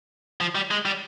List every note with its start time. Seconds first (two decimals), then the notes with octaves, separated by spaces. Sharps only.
0.41 F3
0.55 G3
0.71 G#3
0.86 G3